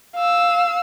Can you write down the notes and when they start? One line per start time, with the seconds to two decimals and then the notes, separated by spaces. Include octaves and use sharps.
0.15 F5 E6